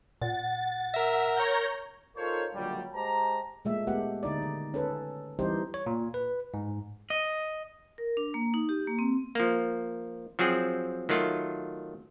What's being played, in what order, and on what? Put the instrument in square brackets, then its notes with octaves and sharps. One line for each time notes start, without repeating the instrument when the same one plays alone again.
[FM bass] A#2 [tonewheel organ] F#5 [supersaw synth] A6
[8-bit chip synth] A#4 A#6 [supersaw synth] E5
[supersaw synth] C#5 A#5 G6
[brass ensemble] D#4 F4 A4 A#4 C5 C#5
C#2 A#2 D3 F#3 G3
G#3 G4 C5 A5 A#5
[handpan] A#2 G#3 A3 E5
G#3 A3 B3 G4 F#5
D3 D#4 D5
D#3
C#4 A4 B4
E3 G3 C4 D#4 G4 C5
[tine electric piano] C#5
A#2
B4
G#2
[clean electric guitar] D#5
[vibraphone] A#4
D4
A#3
D#4
G4
A#3
C4
[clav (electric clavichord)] F3 A#3
F3 F#3 C4 G#4
D#3 F#3 A3 F4